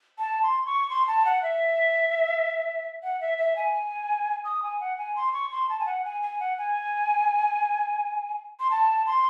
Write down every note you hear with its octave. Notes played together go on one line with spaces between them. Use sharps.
A5
C6
C#6
C6
A5
F#5
E5
F#5
E5
E5
G#5
D#6
G#5
F#5
G#5
C6
C#6
C6
A5
G#5
F#5
G#5
G#5
F#5
G#5
C6
A5
C6